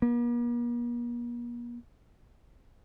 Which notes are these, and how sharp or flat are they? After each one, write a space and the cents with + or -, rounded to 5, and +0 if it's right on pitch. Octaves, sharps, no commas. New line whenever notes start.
A#3 +45